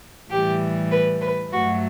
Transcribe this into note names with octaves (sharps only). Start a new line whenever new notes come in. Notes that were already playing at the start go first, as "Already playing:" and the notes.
A2 E3 G3 G4
B4
B4
G2 F#3 A3 F#4